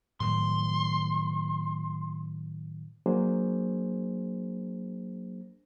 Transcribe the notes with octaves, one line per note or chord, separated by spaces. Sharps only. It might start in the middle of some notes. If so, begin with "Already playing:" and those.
A2 D#3 F#3 C6
F#3 A#3 D4 G#4 C5